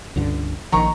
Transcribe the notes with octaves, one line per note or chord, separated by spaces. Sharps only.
C#2 G2 D3
A#1 D#3 F3 A#5 C#6